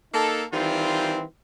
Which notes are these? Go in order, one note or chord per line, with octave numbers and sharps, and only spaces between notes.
A#3 D#4 A4
D#3 E3 G3 C4 F4